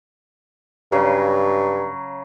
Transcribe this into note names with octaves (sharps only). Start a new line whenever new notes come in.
G2 C#3 F#3